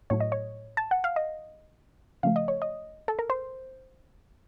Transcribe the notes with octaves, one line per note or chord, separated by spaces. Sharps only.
A2 F#3 A3 C#5
D#5
C#5
A5
F#5
F5
D#5
C#3 F3 A3 F5
D#5
C#5
D#5
A4
A#4
C5